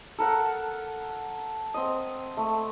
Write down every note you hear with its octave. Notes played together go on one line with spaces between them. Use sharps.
A4 A#4 F#5
C4 D#5
A3